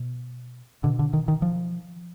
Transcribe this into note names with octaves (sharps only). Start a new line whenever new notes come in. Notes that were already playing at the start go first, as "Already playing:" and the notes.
Already playing: B2
B2 D3
D3
D#3
D#3
F3